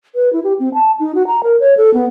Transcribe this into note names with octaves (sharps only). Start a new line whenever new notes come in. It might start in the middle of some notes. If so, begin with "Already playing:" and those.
B4
E4
G4
C4
A5
D#4
F#4
A#5
A#4
C#5
A4
B3